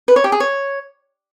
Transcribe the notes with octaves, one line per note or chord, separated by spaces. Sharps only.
B4
C#5
G4
G#4
C#5